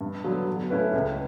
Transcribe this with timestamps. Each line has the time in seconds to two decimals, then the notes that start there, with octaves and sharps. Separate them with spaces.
0.01 G2
0.24 D3 F#3 B3
0.47 F#3
0.70 A3 C#4 E4 B4
0.93 C#2